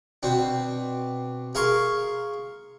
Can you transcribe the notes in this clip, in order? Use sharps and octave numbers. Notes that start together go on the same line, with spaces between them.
B2 C4 D4
G#4 A#4 F5 C6 C#6